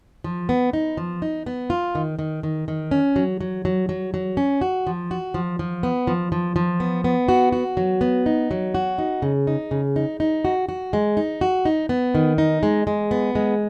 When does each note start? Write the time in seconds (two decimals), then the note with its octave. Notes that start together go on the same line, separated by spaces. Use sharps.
0.24 F3
0.49 B3
0.73 D#4
0.97 F3
1.22 D#4
1.46 B3
1.70 F4
1.95 D#3
2.19 D#3
2.43 D#3
2.68 D#3
2.91 C#4
3.16 F#3
3.41 F#3
3.65 F#3
3.89 F#3
4.14 F#3
4.37 C#4
4.61 F#4
4.87 F3
5.11 F#4
5.34 F3
5.59 F3
5.83 B3
6.07 F3
6.32 F3
6.56 F3
6.80 B3
7.04 B3
7.29 F#4
7.52 F#4
7.77 F#3
8.01 B3
8.26 D#4
8.51 F#3
8.74 F#4
8.98 D#4
9.22 C#3
9.47 D#4
9.71 C#3
9.96 D#4
10.20 D#4
10.45 F#4
10.69 F#4
10.93 G#3
11.17 D#4
11.41 F#4
11.65 D#4
11.89 B3
12.15 D#3
12.38 D#4
12.63 G#3
12.87 G#3
13.11 B3
13.35 G#3